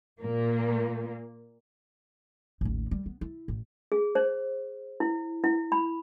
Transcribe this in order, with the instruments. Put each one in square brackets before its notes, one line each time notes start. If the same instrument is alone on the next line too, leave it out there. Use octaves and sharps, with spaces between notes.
[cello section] A#2 A#3
[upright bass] A1 D#2
G3
B3
E4
A1
[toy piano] G#4
C5
E4
E4
B5